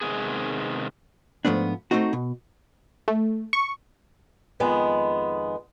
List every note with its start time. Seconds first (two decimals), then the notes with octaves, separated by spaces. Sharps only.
0.01 C3 D#3 G#3 B3 G#4
1.45 G#2 F3 A3 B3 D4
1.91 A3 A#3 C4 D#4 F#4
2.13 B2
3.08 A3
3.53 C#6
4.60 F2 D#3 G#3 B3